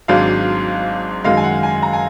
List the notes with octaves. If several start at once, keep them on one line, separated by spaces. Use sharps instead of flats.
G#1 G#2 F#3 D4 F5
F#2 D#3 G#3 F5
G#5
F#5
G#5
A#5
G#5